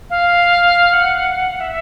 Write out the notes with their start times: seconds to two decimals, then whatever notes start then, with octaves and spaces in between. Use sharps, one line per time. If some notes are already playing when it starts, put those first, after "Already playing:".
0.10 F5
0.93 F#5
1.60 E5